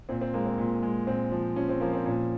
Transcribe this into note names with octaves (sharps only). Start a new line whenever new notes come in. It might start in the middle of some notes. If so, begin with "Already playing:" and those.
A#2 C4
C4
G#3 A#3
C4
A#2
G#3
A#2 C4
F3
F3 C#4
C4
F3 A#3
C4
A#2 C#4